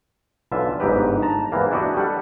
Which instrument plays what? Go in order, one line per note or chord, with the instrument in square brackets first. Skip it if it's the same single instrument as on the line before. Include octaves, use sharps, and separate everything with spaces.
[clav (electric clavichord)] B1 D3 E3 F4 E5
G1 G#2 D#4 G4 B4
A5 A#5
E2 G#2 E3 A#3
D4 E4 F#4 G4 D5 D#5
G3 A4 F#5